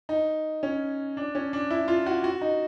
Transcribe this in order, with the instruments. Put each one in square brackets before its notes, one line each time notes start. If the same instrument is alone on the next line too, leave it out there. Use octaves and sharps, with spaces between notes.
[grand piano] D#4
C#4
D4
C#4
D4
E4
F4
F#4
F#4
D#4